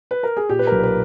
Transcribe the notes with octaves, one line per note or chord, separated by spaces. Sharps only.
B4
A#4
G#4
A#2 G4
B4
B1 A#4
B4